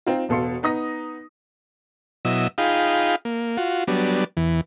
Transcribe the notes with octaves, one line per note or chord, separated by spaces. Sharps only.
C4 D#4 F4
E1 B2 A4 F5 C6 C#7
B3 D#4 D#6 A#6
B2 F#3 E4 D#5 E6
D#4 F4 G#4 F5 G5 B5
A#3
F4 F#4
F#3 G3 B3 D4
E2 E3